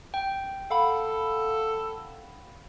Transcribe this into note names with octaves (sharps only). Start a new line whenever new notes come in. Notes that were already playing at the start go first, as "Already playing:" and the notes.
G5
A4 F5 F#5 B5